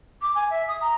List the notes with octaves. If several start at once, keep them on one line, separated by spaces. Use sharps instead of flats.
D6
G#5
E5
D#6
A#5